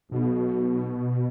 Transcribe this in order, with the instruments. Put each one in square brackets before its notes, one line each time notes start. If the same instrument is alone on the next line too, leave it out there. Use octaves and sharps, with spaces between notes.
[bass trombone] B1 [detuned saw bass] B2